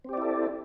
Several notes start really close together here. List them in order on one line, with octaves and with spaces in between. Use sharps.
C4 G4 D5 E4 A4